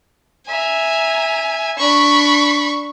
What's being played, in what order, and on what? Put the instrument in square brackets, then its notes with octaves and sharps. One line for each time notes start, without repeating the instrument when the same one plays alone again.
[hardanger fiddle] E5 A#5 [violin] G#5
[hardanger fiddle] D4 [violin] B5 C#6